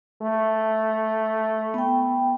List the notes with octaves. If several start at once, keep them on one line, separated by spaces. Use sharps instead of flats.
A3
B3 G5